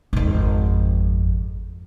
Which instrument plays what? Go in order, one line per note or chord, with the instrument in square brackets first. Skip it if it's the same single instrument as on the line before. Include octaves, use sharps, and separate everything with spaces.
[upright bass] G#1 F2